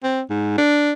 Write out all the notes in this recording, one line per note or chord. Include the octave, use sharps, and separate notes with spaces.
C4
G#2
D4